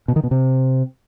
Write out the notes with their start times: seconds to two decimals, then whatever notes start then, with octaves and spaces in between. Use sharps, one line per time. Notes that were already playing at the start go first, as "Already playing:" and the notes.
0.08 B2
0.16 D#3
0.24 B2
0.31 C3